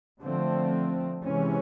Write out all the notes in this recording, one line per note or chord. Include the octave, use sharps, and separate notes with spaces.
D3 F3 A3 C4
C3 E3 G#3 C#4